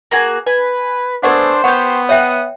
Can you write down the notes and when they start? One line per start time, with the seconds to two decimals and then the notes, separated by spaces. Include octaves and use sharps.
0.11 A#3 F#4 G#4
0.46 B4 G#5
1.23 A3 B3 D4 A#4 C5 F#5 G#5
1.64 B3 G4 C#5 F#5
2.09 C#5 E5 F#5 G5 D#6